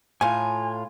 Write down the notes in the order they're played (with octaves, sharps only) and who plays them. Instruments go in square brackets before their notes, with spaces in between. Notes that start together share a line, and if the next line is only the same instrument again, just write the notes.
[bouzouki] A2 F4 [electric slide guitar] G#5